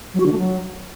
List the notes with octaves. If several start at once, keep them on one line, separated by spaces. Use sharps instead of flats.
F#3
F#4
D3
A3
F#3